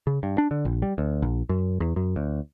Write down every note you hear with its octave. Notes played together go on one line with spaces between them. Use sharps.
C#3
G2
D4
D3
A#1
G3
D2
A#1
F#2
E2
F#2
D2